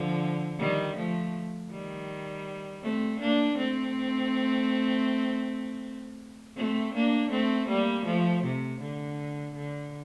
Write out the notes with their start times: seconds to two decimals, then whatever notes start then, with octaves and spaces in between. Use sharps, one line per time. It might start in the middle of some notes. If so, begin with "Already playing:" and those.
Already playing: D3 F3
0.59 D#3 G3
0.96 F3 A3
1.71 D#3 G3
2.83 A3 C4
3.20 A#3 D4
3.58 A3 C4
6.57 A3 C4
6.94 A#3 D4
7.31 A3 C4
7.68 G3 A#3
8.06 F3 A3
8.44 C3
8.81 D3
9.55 D3